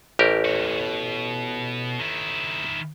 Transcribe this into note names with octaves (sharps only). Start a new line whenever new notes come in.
A1 G4 A#4
A#2 F#4
B2
D#3 E4